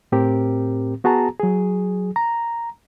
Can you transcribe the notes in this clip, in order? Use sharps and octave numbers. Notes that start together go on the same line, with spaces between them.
A2 C4 G4 A#4
B3 F#4 G#4 A5 A#5
F#3 G#4
A#5